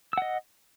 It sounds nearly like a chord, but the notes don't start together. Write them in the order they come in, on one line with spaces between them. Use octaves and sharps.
E6 F#5 D#5